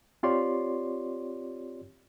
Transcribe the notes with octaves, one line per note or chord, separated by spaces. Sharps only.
C4 F4 G4 C#5 D5 C6